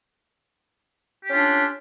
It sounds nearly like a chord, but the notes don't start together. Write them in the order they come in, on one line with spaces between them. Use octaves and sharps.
G4 C#4 F4 D4